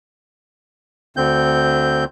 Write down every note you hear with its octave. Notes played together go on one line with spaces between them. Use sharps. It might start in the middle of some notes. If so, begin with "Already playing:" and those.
D2 D3 C4 G6